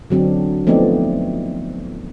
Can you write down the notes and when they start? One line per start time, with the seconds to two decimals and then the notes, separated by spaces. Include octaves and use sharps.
0.10 D3 F#3 C4 D4
0.67 F3 A3 B3 C4 D#4 D5